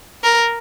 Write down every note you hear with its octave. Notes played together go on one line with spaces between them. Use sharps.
A#4